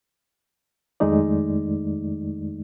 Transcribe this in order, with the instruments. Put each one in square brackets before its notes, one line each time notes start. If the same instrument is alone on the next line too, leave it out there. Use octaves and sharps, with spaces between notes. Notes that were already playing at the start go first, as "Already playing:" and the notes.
[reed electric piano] F2 D#3 G#3 A3 D#4 D5